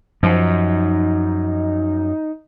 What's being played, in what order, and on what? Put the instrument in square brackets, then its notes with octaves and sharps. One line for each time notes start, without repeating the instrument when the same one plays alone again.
[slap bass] F#2 [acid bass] F3 [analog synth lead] D#4